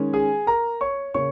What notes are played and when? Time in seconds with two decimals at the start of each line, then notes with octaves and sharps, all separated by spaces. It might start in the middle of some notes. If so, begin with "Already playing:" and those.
Already playing: D#3 G#3 C#4
0.13 G#4 G#5
0.47 A#4 A#5
0.81 C#5 C#6
1.14 C#3 A#3 C#4 C#5 C#6